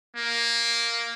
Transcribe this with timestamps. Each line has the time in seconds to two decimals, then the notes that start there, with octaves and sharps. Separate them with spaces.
0.16 A#3